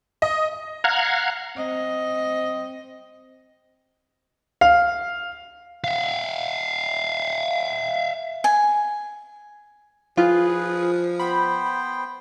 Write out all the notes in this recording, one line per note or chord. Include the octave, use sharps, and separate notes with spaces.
D#5
F5 F#5 A#5 F6 F#6 G#6
C4 D#5
F5
E5 F5
G#5
F3 F4 G#4 B4
B3 C5 G5 B5